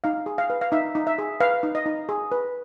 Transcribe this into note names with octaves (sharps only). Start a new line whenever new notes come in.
D#4 F5
G#4
F5
B4
F5
D#4 E5
D#4
E5
G#4
B4 F5
D#4
D#5
D#4
G#4
B4